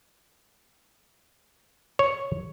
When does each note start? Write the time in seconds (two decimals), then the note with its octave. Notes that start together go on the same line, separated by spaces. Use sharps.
1.99 C#5